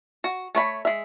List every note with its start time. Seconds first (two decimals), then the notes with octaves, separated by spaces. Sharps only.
0.24 F#4
0.55 A3 C#5 B5
0.85 G#3 E5